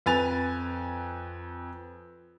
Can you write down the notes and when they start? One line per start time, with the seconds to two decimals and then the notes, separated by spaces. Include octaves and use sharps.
0.06 F2 B4 G#5 A6 F7